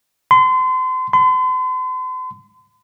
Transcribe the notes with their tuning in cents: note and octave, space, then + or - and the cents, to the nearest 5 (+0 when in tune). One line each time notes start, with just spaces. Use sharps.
C6 -35
C6 -45